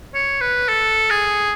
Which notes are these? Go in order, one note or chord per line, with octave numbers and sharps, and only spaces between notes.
C#5
B4
A4
G#4